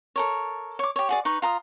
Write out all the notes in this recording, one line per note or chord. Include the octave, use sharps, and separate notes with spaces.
A4 A#4 C#5
C#5 D6
G4 C#5
F#4 G#4 D5
D#4 B4 C#6
F4 A#5 D#6